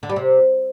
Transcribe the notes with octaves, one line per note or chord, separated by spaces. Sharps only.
D3
G3
C3